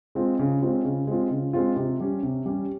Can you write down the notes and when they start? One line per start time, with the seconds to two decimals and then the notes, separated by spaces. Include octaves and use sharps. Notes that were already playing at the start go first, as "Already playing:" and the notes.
0.15 G#3 C4 F4
0.39 C#3
0.62 G#3 C4 F4
0.85 C#3
1.07 G#3 C4 F4
1.30 C#3
1.53 G#3 C4 F4
1.76 C3
2.00 G3 C#4
2.23 C3
2.46 G3 C#4